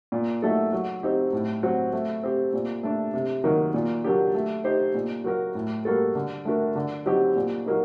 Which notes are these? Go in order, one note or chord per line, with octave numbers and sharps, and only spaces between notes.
A#2
F#3 A3 D#4 A4
F#3
C4 D#4 G4
A2
F#3 C4 F#4
A3
C4 G4
A#2
A3 D4
C3
D#3 F#3 A#3 D#4
A#2
F#3 A#3 D4 G4
A3
D#4 G4 C5
A#2
F#3 A#3 F#4 A#4
A2
G3 A#3 F#4 A4
D3
A3 D4 F#4 A#4
D3
F#3 C4 D#4 G4
A#2
F#3 A#3 D#4